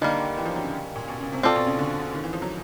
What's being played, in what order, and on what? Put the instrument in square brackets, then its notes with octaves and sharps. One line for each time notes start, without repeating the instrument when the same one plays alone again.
[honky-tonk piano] D3 [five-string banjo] D#3 G3 A#3
[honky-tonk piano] E3
F3
F#3
C#3
A#2
B2
C#3
C3
[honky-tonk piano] B2 [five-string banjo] C4 F4 A4 D5
[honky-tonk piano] B2
C#3
D3
D#3
E3
F3
F#3